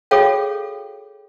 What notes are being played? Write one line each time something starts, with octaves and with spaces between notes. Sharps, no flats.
F#4 G#4 A4 C#5 F5 G5